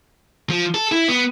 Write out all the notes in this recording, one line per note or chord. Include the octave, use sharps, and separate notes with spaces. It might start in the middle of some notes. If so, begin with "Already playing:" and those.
F3
A4
E4
B3